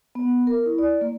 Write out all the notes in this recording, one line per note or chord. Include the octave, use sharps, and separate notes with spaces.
B3
A#4
E4
D5
A#3